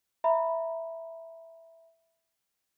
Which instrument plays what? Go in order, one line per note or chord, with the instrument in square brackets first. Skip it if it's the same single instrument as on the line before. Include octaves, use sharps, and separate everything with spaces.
[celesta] E5 A#5 B5